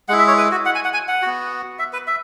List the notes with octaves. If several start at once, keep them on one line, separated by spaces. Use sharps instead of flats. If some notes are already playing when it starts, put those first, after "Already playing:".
G#3 E4 F#5
E5
C#5
B4
F#4
F#5
G#5
F#5
G#5
F#5
B3 F#4
E5
B4
E5